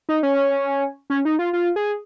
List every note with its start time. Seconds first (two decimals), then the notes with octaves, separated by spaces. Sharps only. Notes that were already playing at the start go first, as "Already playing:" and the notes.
0.09 D#4
0.23 C#4
1.10 C#4
1.25 D#4
1.39 F4
1.53 F4
1.76 G#4